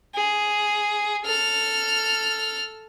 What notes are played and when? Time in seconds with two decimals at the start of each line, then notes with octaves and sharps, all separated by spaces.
0.15 G#4
1.26 A4 F6